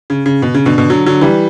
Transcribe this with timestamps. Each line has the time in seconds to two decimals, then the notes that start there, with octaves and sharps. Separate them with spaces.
0.10 C#3
0.26 C#3
0.42 B2
0.54 C#3
0.65 B2 D3
0.78 B2 D3
0.90 D3 F#3
1.06 D3 F#3
1.21 E3 G3